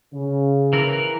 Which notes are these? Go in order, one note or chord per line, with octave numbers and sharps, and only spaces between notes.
C#3
E3 A#4